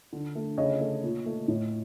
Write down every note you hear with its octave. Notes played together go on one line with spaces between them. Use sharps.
D3
A3
C#3 C#5 D#5
A3
A#2
A3
A2